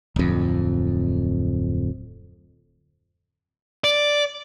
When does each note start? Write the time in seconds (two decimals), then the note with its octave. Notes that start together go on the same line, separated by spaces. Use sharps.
0.16 D1 F2
3.84 D5